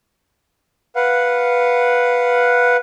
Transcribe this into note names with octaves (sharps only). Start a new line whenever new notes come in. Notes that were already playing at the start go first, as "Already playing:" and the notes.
B4 F5 F#5